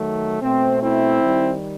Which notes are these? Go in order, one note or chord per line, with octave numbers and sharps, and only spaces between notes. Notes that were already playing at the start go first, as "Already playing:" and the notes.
Already playing: D#3 F#3 A3
B2 A3 C4
C4 E4
D#3 G3